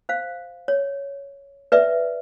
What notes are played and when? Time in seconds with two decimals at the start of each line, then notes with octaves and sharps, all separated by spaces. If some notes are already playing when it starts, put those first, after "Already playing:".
0.09 C5 F5
0.68 C#5
1.72 B4 D5 E5